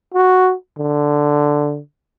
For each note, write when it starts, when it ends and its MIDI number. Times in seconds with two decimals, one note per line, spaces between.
0.14 0.54 66
0.78 1.79 50